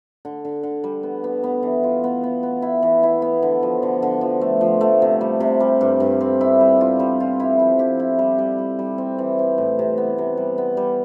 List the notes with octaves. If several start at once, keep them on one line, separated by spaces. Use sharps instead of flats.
D3
D3
D3
G3
B3
B3
B3
E3
F4
B3
B3
B3
E4
E3
E4
B3
D3
F3
D3
D3
F3
A3
F3
A3
C3
G3
C3
G3
G2
G2
C4
E4
G3
F4
G3
F4
E4
F3
G4
E4
G3
G3
G3
G3
C4
E3
C4
A2
C3
B3
C3
G3
B3
G3